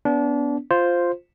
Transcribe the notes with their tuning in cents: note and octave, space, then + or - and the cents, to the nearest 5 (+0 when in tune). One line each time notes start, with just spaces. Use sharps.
B3 +0 D4 -30
F4 +0 C5 +0